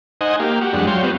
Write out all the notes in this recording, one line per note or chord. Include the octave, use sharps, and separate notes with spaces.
D#4 C5 D#5 F#5 G#5
A#3 G4 F5
F#4 G4
F2 G3 G#3 D4 F#5
F#3 C#5 F5 G5 C6
G3 B3 C4 F4 F#4